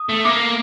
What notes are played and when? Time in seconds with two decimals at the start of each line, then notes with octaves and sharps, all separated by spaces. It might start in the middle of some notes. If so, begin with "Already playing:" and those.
Already playing: D#6
0.09 A3
0.25 A#3 D6